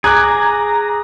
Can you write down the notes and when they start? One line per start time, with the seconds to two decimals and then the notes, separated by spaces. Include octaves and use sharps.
0.04 G#4 A#5 D6 F#6 G#6